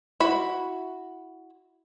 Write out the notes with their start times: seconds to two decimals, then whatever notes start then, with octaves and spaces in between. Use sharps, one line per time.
0.20 E4 F#4 B5